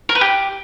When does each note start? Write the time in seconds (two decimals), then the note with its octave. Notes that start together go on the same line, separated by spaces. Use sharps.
0.09 A#4
0.15 B4
0.21 G4